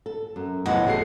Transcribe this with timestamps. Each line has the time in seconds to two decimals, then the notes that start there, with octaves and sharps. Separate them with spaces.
0.06 A4
0.36 F#2
0.66 F#1 E2 A2 D#5 F#5 A5
0.87 A3 F#4 G#4 A4 C7